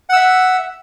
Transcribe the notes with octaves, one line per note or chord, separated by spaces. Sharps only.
E5 F#5 E6